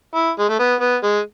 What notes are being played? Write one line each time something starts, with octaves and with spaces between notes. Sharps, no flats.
E4
G#3
A3
B3
B3
G#3